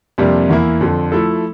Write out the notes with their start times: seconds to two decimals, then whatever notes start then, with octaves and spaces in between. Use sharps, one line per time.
0.18 F2 C3 G3 A#3 D4
0.49 E2 E3 A#3 E4
0.81 F2 D3 F3
1.12 F3 A3 E4 A4